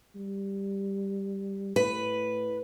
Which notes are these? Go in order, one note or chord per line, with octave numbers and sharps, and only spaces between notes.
G3
A2 B4